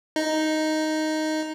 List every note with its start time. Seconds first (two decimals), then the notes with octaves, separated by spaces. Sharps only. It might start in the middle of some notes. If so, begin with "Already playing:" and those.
0.16 D#4